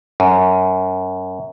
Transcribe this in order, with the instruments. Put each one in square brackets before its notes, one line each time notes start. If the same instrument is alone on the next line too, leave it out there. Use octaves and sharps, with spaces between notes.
[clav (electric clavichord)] F#2